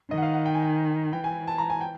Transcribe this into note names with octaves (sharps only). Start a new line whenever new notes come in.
D#3 D#5
F#5
F5
F#5
G5
G#5
G5
E3 G5
G#5
A5
A#5
G#5
G5